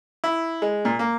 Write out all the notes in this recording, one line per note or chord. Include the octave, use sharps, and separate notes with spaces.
E4
G#3
A#2
A#3